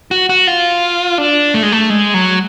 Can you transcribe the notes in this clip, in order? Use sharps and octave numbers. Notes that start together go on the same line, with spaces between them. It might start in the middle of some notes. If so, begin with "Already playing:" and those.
F#4
F#4
F4
D4
A3
G#3
A3
G#3
F#3